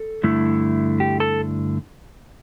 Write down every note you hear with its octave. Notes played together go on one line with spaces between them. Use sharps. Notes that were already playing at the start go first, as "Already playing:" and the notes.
Already playing: A4
G2 D3 A3 E4
G4
A4